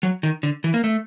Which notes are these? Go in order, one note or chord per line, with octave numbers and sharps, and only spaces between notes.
F#3
D#3
D3
E3
A#3
A3